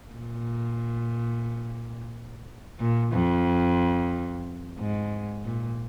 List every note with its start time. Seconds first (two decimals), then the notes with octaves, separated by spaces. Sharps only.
0.14 A#2
2.79 A#2
3.12 F2
4.78 G#2
5.45 A#2